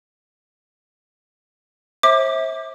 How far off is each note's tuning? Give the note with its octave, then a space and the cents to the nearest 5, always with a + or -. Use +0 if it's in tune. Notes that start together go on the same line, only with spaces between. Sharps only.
C5 +40 E5 -25 D6 +15